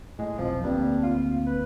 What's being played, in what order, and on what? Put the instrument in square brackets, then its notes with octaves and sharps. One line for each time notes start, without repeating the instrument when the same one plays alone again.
[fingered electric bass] A2 [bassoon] G#3
[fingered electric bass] F1 B1 F2 [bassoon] F3
[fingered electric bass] D2 A#3 C4 [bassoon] G2
[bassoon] F4
B4